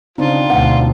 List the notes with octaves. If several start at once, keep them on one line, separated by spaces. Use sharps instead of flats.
C#3 C4 D4 D#4 F4
D2 B2 F#5